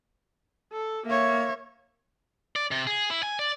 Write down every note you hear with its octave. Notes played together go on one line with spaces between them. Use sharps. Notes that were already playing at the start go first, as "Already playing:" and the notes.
A4
A#3 C#5 E5
D5
C3
G#4
E4
G#5
D5